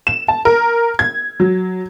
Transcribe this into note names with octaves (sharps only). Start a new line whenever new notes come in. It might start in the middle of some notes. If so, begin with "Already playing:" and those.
E7
A5
A#4
G#6
F#3